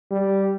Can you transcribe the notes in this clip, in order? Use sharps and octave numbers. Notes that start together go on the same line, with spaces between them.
G3